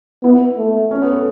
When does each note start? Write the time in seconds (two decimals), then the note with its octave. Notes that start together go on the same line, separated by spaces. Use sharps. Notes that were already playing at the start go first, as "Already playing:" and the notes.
0.23 B3 E4
0.57 A3
0.91 C#4
1.02 B3
1.13 A3